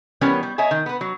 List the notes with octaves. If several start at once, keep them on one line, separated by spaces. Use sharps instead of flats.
E3 G3 B3 C#4 A#4 C#5
G3
C#5 D#5 E5 G#5 A#5
D#3
B3 B4
F#3